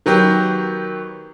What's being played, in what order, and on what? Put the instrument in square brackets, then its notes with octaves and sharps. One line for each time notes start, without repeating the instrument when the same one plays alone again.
[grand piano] D#3 F#3 B3 G4